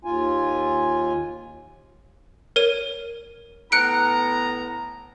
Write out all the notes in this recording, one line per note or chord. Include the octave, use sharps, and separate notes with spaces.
D#2 F4 G#5
A#4 C#5 D#7
A2 B3 A#5 F#6 C#7 D7